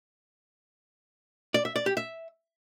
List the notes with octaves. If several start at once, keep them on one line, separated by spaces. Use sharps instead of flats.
D5
E5
D5
G4
E5